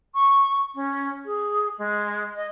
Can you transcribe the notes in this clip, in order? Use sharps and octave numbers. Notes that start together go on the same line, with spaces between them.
C#6
C#4
G#4
G#3
D#5